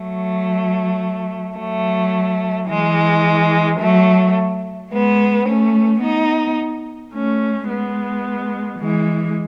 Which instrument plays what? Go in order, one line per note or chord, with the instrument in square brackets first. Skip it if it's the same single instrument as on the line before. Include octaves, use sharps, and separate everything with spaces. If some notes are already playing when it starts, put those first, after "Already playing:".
Already playing: [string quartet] F#3 A3
F#3 A3
E3 G#3
F#3 A3
G#3 B3
A3 C#4
B3 D#4
A3 C#4
G#3 B3
E3 G#3